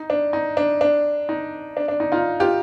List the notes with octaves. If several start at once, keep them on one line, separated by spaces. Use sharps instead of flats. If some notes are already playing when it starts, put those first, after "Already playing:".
Already playing: D#4
D4
D#4
D4
D4
D#4
D4
D4
D#4
D#4 F4
F4 G4